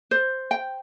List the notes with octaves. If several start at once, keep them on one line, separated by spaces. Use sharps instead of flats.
C5
G5